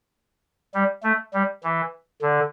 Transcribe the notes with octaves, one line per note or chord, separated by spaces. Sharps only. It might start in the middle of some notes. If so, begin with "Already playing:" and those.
G3
A3
G3
E3
D3